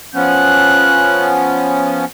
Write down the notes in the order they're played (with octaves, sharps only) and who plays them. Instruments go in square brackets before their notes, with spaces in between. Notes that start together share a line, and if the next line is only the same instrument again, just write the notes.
[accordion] F3 B3 C#4 [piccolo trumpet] F#6